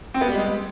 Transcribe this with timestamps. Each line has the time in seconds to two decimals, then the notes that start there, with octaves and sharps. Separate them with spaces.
0.14 C4
0.21 B3
0.28 G3
0.34 G#3